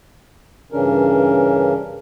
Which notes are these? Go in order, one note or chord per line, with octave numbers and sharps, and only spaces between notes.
G2 C#3 E3 C#4 D4 A#4